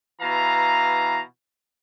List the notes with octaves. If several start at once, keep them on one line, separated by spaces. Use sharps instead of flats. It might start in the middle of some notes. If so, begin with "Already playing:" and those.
B2 E3 F5 A#5